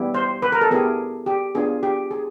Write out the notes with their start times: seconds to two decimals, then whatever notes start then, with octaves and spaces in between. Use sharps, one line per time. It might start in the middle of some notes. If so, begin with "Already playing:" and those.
Already playing: G3 B3 E4 G4
0.14 C5
0.42 B4
0.52 A#4
0.61 A4
0.71 B3 E4 G4 G#4
1.26 G4
1.55 B3 D4 F4 G#4
1.83 G4
2.11 G#4